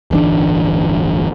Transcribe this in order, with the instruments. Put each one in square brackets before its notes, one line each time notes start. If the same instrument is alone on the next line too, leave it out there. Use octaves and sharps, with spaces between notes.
[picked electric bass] D1 G1 E3 D4